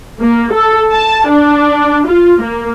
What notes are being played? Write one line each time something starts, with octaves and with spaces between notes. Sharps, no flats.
A#3
A4
A5
D4
F4
A#3